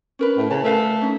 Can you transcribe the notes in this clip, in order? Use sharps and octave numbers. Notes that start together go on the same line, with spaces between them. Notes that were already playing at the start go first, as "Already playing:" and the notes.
C#4 A#4 B4
A2
C#3 A5
A3 A#4 B4 F5
C#4 D#4